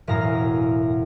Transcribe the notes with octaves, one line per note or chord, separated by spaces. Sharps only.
E1 F#2 A2 F5 A#5 A#6